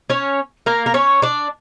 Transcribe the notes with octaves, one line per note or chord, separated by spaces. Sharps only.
C#4 C#5
A#3 A#4
A#4
C#4 C#5
D4 D5